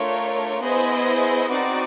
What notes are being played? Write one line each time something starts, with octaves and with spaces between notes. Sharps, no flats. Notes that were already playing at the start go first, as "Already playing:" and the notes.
Already playing: A3 D4 F4 A#4 C#5
B3 E4 G#4 C5 D#5
C4 D#4 F#4 B4 D5